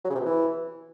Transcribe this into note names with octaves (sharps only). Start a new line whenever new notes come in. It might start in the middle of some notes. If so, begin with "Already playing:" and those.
F#3
C#3
C3
B2
E3